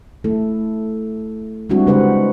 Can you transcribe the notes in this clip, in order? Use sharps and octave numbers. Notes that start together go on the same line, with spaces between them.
A3 E4 A4
G3 G#3 C4 D4 E4 F#4
C#3 G#3 B4 C5 F#5